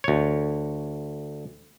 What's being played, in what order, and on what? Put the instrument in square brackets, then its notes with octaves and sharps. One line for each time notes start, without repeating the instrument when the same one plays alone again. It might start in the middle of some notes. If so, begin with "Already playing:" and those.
[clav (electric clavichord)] D2 C#5